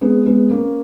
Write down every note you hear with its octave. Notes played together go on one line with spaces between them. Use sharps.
G#3 B3
G#3 B3
A#3 C#4